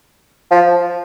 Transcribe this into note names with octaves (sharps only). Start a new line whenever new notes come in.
F3